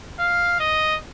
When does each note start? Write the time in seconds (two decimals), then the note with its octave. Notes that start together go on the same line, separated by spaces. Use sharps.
0.19 F5
0.60 D#5